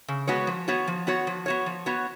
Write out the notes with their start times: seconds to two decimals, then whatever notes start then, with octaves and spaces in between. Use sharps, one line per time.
0.08 C#3
0.27 G#3 B3 F#4 C#5
0.47 F3
0.68 B3 F#4 C#5
0.88 F3
1.07 B3 F#4 C#5
1.27 F3
1.46 B3 F#4 C#5
1.66 F3
1.86 B3 F#4 C#5